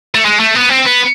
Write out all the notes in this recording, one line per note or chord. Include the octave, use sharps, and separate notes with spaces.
A3
G#3
A3
B3
C4
B3